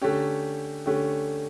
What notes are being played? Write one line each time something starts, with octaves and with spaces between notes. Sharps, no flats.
D3 A3 C#4 G4
D3 A3 C#4 G4